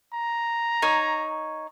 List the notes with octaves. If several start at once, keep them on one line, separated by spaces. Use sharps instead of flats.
A#5
D#4 C#5